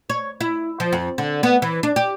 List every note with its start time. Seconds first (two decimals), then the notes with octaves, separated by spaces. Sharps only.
0.10 C#5
0.41 E4
0.80 F3
0.92 F2
1.18 D3
1.43 B3
1.62 E3
1.83 D4
1.96 G4